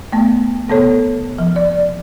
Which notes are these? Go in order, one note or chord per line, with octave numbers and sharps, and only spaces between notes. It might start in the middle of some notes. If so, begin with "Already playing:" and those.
A3 B3
C3 B3 A4 C#5
F3
D5